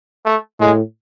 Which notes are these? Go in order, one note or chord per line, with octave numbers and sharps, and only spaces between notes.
A3
A2 G#3